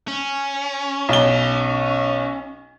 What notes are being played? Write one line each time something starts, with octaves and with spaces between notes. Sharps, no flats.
C#4
B1 G7